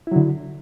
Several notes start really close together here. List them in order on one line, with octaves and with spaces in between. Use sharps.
E4 F#3 D3